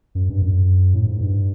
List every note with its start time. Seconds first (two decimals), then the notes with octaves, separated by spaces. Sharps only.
0.15 F#2
0.30 G2
0.42 F#2
0.94 A2
1.07 G#2
1.21 G2